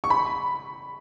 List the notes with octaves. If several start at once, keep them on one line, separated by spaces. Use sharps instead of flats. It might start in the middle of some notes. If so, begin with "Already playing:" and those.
C#6
B5